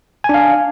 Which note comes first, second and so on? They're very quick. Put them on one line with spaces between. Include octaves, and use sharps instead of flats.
G#5 D4 F5